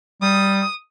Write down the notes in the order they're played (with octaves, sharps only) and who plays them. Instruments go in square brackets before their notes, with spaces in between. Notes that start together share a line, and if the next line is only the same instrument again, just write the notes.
[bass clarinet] G3 [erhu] D#6